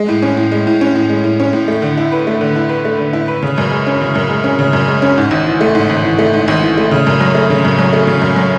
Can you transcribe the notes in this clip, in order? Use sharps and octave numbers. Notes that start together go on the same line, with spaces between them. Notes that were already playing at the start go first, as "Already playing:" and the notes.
Already playing: G#3
A2
C#4
A2
G#3
A2
C#4
A2
G#3
A2
C#4
A2
A3
D3
E4
B4
A3
D3
E4
B4
A3
D3
E4
B4
C#3
F#2
G#3
C#4
C#3
F#2
G#3
C#4
C#3
F#2
G#3
C#4
G#2
G#1
E3
A3
G#2
G#1
E3
A3
G#2
G#1
E3
A3
C#3
F#2
F#3
A3
C#3
F#2
F#3
A3
C#3
F#2
F#3